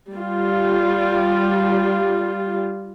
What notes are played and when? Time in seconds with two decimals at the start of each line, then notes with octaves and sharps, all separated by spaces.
0.13 G3 F4